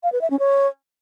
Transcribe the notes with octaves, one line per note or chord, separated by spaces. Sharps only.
F5
B4
E5
C#4
C#5